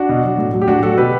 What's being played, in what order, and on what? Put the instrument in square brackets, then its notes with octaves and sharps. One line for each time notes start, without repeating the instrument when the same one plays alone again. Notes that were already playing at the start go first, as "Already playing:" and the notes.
Already playing: [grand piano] D4 F#4
B2
F#3
A2
F#3
G4
A2 D4 F#4
F#3 F#4 A4
B2 G4 B4